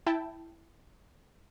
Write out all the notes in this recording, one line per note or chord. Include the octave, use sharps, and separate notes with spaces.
E4 G5 A5